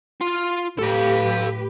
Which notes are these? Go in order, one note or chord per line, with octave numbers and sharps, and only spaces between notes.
F4
A2 G4 A4 B4 F5